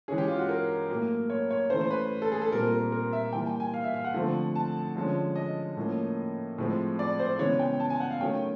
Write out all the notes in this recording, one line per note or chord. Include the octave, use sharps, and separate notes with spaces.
E3 G#3 C#4 G#4
G4
F4
F#4
A#4
A2 F#3 A#3
C#5
C#5
E3 A3 C#4 C5
C5
B4
A4
G#4
A4
A#2 G3 C4 A#4
A#4
A#4
E5
E3 G3 A#3 G5
G5
G#5
F5
E5
F5
F#5
D3 F3 A3 C4
A5
D3 F3 G#3 C#4
D#5
A2 F3 A#3 C#4
A2 F3 G#3 C4
D5
C5
C#3 E3 G#3 B3 C#5
G5
A5
G#5
F#5
F5
D#3 F#3 A3 C#4 G5